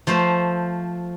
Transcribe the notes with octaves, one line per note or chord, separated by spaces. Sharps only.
F3 A3 C5